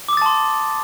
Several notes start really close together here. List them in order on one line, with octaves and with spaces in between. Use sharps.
D6 D#6 A6 A5 C6